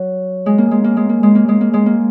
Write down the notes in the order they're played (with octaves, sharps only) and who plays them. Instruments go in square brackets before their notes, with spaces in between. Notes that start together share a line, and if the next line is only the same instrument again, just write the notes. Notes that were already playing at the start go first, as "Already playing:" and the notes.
Already playing: [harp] F#3
G#3
A#3
G#3
A#3
G#3
A#3
G#3
A#3
G#3
A#3
G#3
A#3